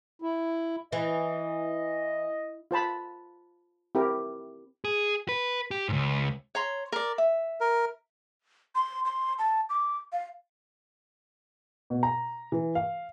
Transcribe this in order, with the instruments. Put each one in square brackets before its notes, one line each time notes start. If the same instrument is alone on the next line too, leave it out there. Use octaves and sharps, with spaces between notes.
[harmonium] E4
[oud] E3 [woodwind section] D#5
[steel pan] F4 C5 A5 B5
C4 E4 G4 A#4
[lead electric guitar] G#4
B4
G4
C#2 G#2
[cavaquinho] C#5 A#5 C6
A#4 D5
E5
[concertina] A#4
[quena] C6
C6
A5
D6
F5
[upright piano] B2
A#5
E3
F5